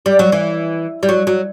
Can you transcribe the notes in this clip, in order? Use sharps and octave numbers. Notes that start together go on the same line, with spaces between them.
G3
F#3
E3
G3
F#3
F#3